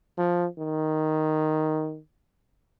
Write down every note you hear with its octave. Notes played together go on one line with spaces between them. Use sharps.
F3
D#3